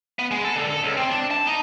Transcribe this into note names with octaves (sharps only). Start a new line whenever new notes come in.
B3
G#3
A4
D3
A4
C#2
C4
D4
A5
D#4